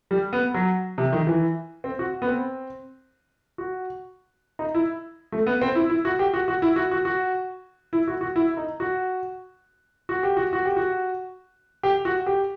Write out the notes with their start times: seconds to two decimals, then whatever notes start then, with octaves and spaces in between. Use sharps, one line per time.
0.11 G3
0.33 B3
0.54 F#3
0.98 C3
1.12 D#3
1.27 E3
1.84 C4
1.99 F#4
2.22 B3
2.27 C4
3.58 F#4
4.59 D#4
4.74 E4
5.32 A3
5.47 B3
5.62 C4
5.75 E4
5.90 E4
6.05 F#4
6.19 G4
6.34 F#4
6.48 F#4
6.62 E4
6.76 F#4
6.91 F#4
7.05 F#4
7.93 E4
8.08 F#4
8.21 F#4
8.36 E4
8.57 D#4
8.80 F#4
10.09 F#4
10.23 G4
10.37 F#4
10.53 F#4
10.65 G4
10.77 F#4
11.83 G4
12.05 F#4
12.26 G4